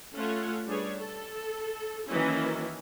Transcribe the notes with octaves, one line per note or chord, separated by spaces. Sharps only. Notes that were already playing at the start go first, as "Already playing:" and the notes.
A3 C#4 F4 A4 C#5 F#5
G3 D4 G#4 B4 C#5
A4
D#3 E3 F#3 A#3 C#4 E4